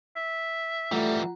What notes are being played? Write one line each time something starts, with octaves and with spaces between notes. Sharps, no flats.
E5
E3 G3 A3 F4 F#5 A#5